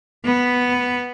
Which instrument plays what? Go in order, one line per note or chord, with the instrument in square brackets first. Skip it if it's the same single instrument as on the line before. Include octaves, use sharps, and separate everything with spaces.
[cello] B3